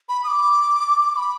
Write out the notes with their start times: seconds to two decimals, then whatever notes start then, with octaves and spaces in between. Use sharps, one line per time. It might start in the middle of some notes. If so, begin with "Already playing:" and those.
0.09 B5
0.24 D#6
0.28 D6
1.01 D6
1.16 B5